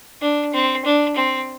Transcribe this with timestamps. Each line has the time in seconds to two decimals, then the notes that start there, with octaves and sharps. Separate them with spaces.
0.22 D4
0.53 C4
0.85 D4
1.16 C4